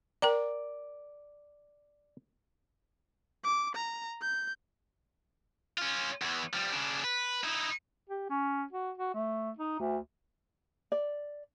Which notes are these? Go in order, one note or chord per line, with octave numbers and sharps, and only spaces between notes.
A#4 D5 G5 A#5
D6
A#5
G6
C#4 F4
E2 E3
F3 G3
C#3 D4
B4
D#4 E4
G4
C#4
F#4
F#4
A3
D#4
D2
D5